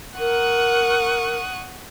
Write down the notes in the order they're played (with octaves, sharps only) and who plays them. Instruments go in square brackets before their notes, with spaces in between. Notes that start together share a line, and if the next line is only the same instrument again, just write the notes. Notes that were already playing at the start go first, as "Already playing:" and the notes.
[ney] A#4 [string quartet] F#5 C#6 D#6